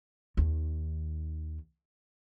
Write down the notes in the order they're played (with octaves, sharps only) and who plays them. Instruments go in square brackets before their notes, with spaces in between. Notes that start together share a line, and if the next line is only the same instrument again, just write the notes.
[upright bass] D#2 D#3